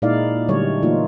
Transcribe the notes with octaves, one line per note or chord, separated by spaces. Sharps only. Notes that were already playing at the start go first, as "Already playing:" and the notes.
A#2 G#3 D#4 E4 D5 F5
D3 F#3 G3 A3 C#5
E3 A3 A#3 D#4 F4